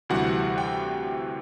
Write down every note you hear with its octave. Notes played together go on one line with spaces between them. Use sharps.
D2 C3 E3 G3 F#4 F#5
G5